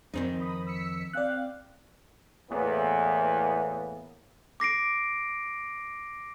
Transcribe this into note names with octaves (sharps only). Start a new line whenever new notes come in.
F2 D#3 C4 D#4
B5 D#6
E6 B6 C#7
C4 D5 F5 G5 F#6
E2 A2 E3 A#3 B3
D6 A#6 C7 D7